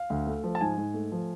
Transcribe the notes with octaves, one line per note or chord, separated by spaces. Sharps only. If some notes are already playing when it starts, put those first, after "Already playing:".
Already playing: F5
D2
A3
F3
A5
G#2 G#5
G#2
A3
F3